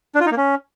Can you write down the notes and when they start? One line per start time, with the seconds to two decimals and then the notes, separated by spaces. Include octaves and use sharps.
0.15 D4
0.21 F4
0.26 D#4
0.32 A#3
0.37 C#4